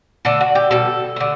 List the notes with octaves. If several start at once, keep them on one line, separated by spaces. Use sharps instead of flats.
D3 A3 A4
F#4
G4
B2 G3 A4
D3 A3